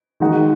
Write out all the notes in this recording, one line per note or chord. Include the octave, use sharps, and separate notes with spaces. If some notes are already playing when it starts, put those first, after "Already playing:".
D#3 G#3 D#4 F#4